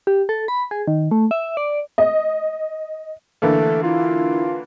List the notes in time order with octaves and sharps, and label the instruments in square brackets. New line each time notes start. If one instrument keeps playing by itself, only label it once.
[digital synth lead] G4
A4
B5
G#4
D#3
A3
E5
D5
[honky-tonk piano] D#5
[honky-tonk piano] D3 E3 A#3 [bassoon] A3
[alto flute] E4 [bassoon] F4